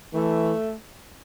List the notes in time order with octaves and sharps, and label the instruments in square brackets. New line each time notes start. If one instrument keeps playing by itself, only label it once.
[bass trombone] E3 [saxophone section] A3